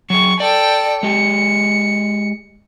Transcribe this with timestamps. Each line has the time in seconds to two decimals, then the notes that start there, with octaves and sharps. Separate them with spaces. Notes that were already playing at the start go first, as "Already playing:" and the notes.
0.10 F#3 G#4 C#6
0.40 A4 D5 G5
1.03 G#3 G4 C#7